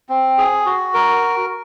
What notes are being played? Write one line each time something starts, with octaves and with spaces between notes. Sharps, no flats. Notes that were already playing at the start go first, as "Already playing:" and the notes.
C4
G#4
F#4
A#4